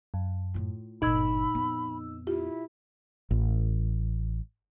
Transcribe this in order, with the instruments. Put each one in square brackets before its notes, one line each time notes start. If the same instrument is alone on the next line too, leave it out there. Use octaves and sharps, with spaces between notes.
[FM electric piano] F#2
[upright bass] A2 F4
[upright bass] G1 F#2 [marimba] A#2 G#6 [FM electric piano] D#4 E6 [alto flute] B5
[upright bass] F2 B3
[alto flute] E4 [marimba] F4 G4
[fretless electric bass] A1